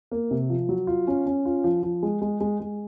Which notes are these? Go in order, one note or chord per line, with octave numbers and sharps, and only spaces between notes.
A#3
C3
F3
F#3
F4
C#4
C#4
F4
F3
F3
G#3
G#3
G#3
G#3